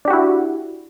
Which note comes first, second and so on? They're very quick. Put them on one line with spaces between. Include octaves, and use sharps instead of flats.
D4 G4 F#4 E4